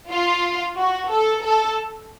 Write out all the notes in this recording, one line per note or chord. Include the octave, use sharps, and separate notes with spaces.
F4
F#4
A4
A4